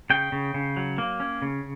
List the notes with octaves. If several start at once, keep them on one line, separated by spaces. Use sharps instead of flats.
C#3 G5
C#3
C#3
F#3
A#3
C#4
C#3